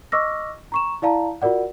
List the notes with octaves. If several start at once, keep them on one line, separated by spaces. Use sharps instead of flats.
D#5 C#6 D6 E6 F6 A#6
A#5 C#6 E7
E4 D5 F5 A5 A#5
F4 F#4 A#4 D5 F#5